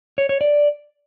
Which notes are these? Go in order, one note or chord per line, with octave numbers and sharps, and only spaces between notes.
C#5
C#5
D5